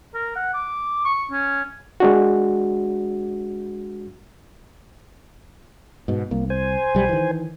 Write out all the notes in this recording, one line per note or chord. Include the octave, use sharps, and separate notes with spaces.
A#4
F#5
D6
C#6
C#4
G#3 D4 F#4
G#2 B2
C2 A#3
C5 G#5
B1 G3
D#3 E3